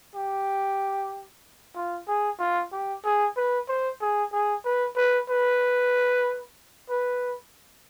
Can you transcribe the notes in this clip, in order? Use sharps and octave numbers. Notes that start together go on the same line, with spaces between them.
G4
F4
G#4
F4
G4
G#4
B4
C5
G#4
G#4
B4
B4
B4
B4